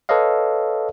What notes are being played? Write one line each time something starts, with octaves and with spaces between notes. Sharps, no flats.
A4 B4 C#5 D#5 F5